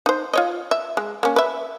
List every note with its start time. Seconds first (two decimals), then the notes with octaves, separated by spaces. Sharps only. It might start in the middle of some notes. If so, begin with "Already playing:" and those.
0.06 D#4 C5
0.33 F4 C#5 D#5
0.71 E5
0.97 G#3
1.23 A#3 C#4
1.36 B4 E5